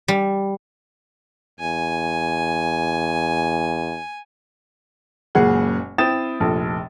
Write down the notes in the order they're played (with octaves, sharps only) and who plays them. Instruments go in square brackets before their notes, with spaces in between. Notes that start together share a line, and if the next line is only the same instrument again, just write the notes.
[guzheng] G3
[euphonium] E2 [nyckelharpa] G#5
[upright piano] F#1 A#2 C#3 G#3 G#4 F#5
C4 E4 G5 D#6 A6 E7
F1 A#1 A4